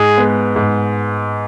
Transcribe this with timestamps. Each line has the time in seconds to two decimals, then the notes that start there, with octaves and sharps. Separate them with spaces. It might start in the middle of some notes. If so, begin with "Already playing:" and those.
Already playing: G#2 G#4
0.18 G#3 B3
0.56 G#2